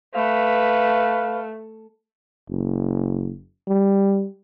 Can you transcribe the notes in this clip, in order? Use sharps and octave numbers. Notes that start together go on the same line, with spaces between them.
A3 B4 F5
F#1
G3